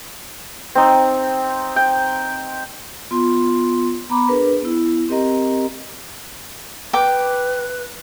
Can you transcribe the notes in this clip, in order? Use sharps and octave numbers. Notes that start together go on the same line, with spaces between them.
C4 D#4
G5
B3 F4 C6
B3 A#5 B5 D6
D4 G#4 A#4 B4
B3 E4
C4 G4 A#4 D#5 A#5
B4 G5 D6